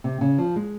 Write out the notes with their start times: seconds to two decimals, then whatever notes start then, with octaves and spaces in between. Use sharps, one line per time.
0.04 C3
0.21 C#3
0.38 F3
0.56 G#3